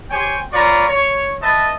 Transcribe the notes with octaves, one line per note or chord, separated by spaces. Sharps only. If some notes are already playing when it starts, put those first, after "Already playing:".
G4 C5 C#5 G5 G#5
F4 B4 C#5 D5 A#5 C#6
C#5
B4 D#5 E5 A5